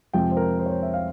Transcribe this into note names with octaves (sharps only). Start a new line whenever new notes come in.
F2 C3 F3 G#3 G5
C5
A#4
C5
C#5
C5
E5
F5